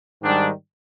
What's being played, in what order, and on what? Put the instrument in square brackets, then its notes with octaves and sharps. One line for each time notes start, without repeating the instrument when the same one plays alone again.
[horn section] G#2 D#3 G3 D4